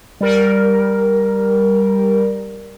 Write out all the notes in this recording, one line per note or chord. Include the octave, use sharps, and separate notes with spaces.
G3 A#4